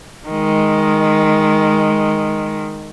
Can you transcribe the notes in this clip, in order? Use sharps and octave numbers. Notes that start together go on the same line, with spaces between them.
D#3 G#3